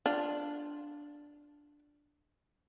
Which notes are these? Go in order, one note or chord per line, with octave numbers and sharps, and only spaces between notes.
D4 F4